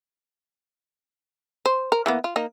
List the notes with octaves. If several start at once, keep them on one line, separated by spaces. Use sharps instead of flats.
C5
A#4
E3 A#3 B3
F4
A#3 D#4